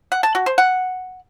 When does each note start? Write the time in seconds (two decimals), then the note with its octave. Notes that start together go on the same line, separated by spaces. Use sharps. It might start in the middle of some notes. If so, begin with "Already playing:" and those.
0.12 F#5
0.23 A5
0.35 F#4
0.46 C5
0.58 F#5